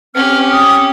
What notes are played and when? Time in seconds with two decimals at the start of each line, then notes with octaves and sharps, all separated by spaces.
0.15 C4 C#4 G4 F6
0.52 D#6